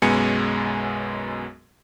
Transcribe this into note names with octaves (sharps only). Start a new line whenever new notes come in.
B1 F#2 G#3 B3 G#5 C#7